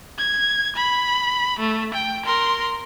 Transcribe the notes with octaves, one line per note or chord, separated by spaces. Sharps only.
G#6
B5
A3
G5
A#4 C6